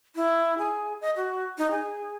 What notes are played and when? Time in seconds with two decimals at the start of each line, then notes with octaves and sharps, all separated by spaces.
0.16 E4
0.58 G#4
1.01 D#5
1.16 F#4
1.58 D#4
1.71 G#4